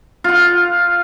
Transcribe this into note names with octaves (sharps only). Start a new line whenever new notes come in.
F4 F#5